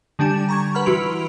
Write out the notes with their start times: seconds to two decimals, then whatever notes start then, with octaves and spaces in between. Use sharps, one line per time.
0.19 D3 G3 D4 G#5 E7
0.49 A#5 C#6 G#6
0.75 B4 F#5 B5 F6
0.86 E3 F#4 C6 D7 F7